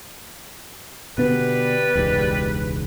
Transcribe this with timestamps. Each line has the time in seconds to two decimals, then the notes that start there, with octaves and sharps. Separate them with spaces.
1.18 B2 D3 G3 B3 B4
1.95 E1 C#2 G#2